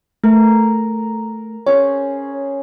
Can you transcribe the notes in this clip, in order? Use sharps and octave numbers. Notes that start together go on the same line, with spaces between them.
A3 A#4
C#4 G#4 C5 C#5